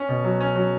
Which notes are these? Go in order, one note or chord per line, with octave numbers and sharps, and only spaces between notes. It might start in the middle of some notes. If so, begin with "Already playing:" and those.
Already playing: C#4
B2
F#3
C#4
F#3